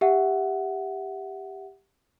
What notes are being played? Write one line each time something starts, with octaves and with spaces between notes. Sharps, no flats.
G4 E5 F#5